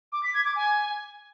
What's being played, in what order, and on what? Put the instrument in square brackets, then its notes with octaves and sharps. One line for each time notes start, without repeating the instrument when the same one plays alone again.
[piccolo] D6
B6
G#6
D6
G#5